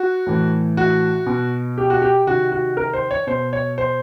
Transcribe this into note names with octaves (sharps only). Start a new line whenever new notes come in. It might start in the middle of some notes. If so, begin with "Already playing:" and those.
Already playing: F#4
A2 E3
F#4
B2
G4
F#4
G4
C3 D#3 F#4
F#4
A#4
C5
C#5
B2 C5
C#5
C5